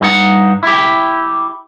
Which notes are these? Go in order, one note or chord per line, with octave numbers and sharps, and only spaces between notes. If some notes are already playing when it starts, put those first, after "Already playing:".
G2 D#4 F#5
E4 G4